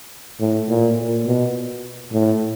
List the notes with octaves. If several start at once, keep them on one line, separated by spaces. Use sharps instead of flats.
A2
A#2
A#2
B2
A2